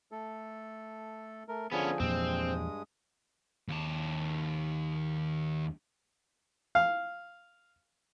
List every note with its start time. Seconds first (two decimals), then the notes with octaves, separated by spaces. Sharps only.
0.12 A3 A4
1.48 A3 A#4
1.72 D3 F3 B3 C#4 G#4
2.00 E2 G2 A#2 F3 G#3 C4 D#6
3.69 D#2 A5
6.75 F5